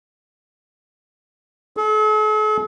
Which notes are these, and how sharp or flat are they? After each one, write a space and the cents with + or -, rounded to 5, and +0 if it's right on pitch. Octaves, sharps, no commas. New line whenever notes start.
A4 -45